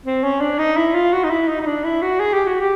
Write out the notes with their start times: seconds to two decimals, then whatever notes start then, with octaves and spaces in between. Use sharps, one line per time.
0.05 C4
0.24 C#4
0.41 D4
0.59 D#4
0.77 E4
0.94 F4
1.13 F#4
1.24 D#4
1.31 E4
1.48 D#4
1.61 D#4
1.66 D4
1.84 E4
2.02 F#4
2.20 G#4
2.34 G4
2.47 F#4
2.61 G4